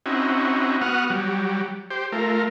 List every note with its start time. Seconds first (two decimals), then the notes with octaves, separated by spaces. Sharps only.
0.06 C4 C#4 D#4 E4 F#4
0.81 B3 F#4 F#5 D#6 F6
1.10 F#3 G3
1.90 G4 C5
2.12 A3 F4 A#4